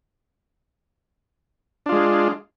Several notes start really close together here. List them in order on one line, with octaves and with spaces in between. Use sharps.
D4 F4 G#3